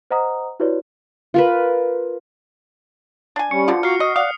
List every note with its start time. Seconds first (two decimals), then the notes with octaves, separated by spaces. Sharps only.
0.11 C5 D#5 F#5 A#5 D#6
0.60 E4 F#4 G4 B4 C#5 D5
1.34 F4 A#4 B4
3.36 D4 G#5
3.51 G3 C#4 C#6 C#7
3.68 B2 D3 F3 F4
3.83 A#3 F#4 F6 C7
4.00 D#5
4.16 D5 F5 F#5 D#6